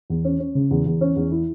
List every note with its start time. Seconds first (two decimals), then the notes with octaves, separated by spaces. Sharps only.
0.10 E2
0.25 C#4
0.40 C#4
0.55 C#3
0.71 E2
0.86 E2
1.01 C#4
1.16 E2
1.31 E4